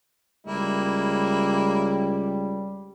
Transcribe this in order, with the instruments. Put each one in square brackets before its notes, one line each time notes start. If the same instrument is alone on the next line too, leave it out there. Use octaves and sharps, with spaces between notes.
[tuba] C#2 [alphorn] G3 [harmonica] A#3 E4